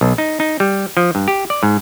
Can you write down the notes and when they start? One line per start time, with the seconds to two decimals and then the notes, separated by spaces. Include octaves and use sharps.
0.01 B1
0.18 D#4
0.40 D#4
0.60 G3
0.97 F3
1.15 G2
1.28 G4
1.50 D5
1.63 G#2